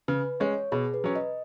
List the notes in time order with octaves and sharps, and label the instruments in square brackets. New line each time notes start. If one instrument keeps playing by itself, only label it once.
[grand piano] C#3 [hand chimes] B4
[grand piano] G#3 C#4 [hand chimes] C#5
[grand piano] B2 [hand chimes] G#4
[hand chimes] B4
[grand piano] F#3 C#4
[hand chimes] D#5